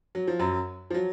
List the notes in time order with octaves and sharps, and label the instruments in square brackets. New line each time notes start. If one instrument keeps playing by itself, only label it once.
[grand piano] F#3
F3
F#2 F#3
F3
F#3